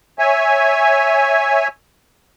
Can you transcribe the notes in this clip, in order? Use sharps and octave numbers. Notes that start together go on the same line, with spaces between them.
C#5 E5 G#5